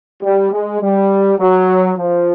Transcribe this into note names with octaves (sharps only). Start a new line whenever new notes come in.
G3
G#3
G3
F#3
F3